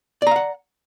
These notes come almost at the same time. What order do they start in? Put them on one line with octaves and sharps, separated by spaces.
D5 A#5 F5 F#5